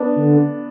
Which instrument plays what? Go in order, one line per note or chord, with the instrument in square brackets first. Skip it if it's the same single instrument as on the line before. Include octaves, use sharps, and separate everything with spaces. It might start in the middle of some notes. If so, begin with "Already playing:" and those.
Already playing: [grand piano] B3 D4
[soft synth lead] D3